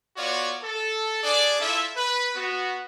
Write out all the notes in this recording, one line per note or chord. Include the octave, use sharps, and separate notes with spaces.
B3 F4 F#4 C#5 D5
A4
D4 G#4 D5
E4 F4 A4 E5
B4
B3 F#4